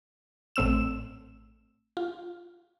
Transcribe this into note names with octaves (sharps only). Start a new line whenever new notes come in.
A1 A3 C4 E6 E7
F4